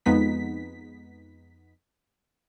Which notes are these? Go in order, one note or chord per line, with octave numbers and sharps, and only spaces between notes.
F2 G#3 B3 D#4 B6